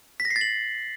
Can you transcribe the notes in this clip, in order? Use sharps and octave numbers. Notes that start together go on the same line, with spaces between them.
B6
A#6
C7
A6
F#7